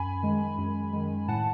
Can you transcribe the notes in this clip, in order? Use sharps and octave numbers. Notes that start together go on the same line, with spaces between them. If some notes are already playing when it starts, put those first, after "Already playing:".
Already playing: F#2 G#5 B5
D#3 G#3
F#2
D#3 G#3
A2 F#5 A5